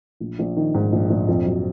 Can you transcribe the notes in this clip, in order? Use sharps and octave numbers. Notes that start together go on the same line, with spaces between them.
A#1
A#1
D#3
G#2
A#1
A#1
F2
F#3